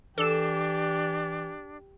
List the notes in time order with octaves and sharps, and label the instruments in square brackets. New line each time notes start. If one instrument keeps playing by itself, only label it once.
[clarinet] E3 [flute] D4 [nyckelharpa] G4 [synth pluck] A4 E7